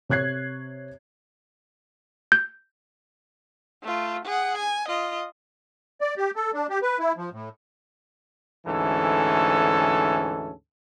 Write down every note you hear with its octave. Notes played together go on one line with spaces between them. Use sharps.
C3 C#5 F#6 G#6 C7
G6
A3 F4
G#4 F#5
G#5
F4 D#5
D5
G4
A4
D4
G4
B4
E4
F3
A2
D2 G#2 E3 C#4 A4